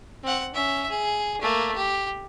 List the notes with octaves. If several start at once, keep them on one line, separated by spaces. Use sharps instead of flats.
C4 F#5
C#4 E5
G#4
A3 A#3
G4